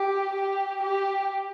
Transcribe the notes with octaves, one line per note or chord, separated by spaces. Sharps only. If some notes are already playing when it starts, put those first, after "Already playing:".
Already playing: G4
G4
G4